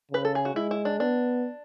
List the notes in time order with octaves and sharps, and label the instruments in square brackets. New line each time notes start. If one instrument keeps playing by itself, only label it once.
[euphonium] C#3 [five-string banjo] B4
[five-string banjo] A4
G#4
F#4
[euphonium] G#3 [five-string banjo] E4
[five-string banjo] E4
D4
[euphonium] B3 [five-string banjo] D4